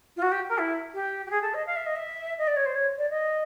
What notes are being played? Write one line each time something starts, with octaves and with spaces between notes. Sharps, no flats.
F4
F#4
G4
A#4
E4
G4
G4
G#4
A4
D#5
F5
E5
D#5
E5
D#5
D5
C#5
C5
C#5
D5
D#5